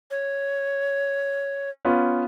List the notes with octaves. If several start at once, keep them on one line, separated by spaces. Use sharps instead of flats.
C#5
B3 C#4 F4